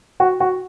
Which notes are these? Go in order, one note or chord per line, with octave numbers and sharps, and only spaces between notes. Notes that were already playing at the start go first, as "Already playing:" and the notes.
F#4
F#4